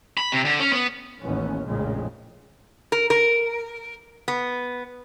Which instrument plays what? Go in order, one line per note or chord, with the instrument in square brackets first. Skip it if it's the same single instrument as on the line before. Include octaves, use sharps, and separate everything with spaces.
[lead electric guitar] B5
C3
D3
C#4
B3
[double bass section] A1 D#2 B3 C#4
A#1 F2 A2 C#3 G#3
[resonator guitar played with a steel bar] A#4
A#4
B3